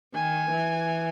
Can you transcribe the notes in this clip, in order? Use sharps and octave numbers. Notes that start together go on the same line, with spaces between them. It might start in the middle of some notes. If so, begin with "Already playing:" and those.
D#3 G#5
E3